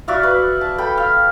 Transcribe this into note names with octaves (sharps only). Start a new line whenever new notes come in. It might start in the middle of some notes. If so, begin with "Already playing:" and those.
F#4 D5 E5 F5
B4
A5
A4 G5 B5
F5